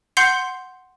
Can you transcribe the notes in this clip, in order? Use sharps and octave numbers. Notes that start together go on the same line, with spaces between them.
F#5 C6 G6 C7 C#7